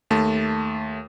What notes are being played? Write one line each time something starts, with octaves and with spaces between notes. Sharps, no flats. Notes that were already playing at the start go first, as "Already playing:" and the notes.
D#2 A3 A5